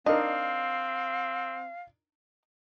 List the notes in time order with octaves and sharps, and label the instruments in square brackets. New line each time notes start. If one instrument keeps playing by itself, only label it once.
[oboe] C4 [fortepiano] D4 D#4 A#4 [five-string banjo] D#5 [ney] F5